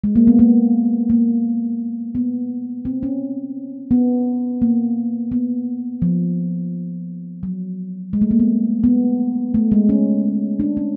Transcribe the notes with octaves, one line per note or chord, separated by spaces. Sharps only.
G#3
A#3
B3
A#3
A#3
B3
C4
C#4
B3
A#3
B3
F3
F#3
G#3
A3
A#3
B3
B3
A3
G#3
C#4
D4
C#4